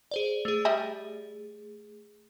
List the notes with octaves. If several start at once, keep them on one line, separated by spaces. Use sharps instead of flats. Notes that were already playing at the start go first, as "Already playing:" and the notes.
G#4 C5 D5
A3 G#4
G3 D#5 E5